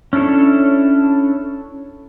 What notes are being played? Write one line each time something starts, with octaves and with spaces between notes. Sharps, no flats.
C#4 D4 E4 A4 C#5